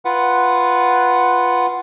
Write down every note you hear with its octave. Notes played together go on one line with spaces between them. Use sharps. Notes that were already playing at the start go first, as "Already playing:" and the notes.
F4 B4 F#5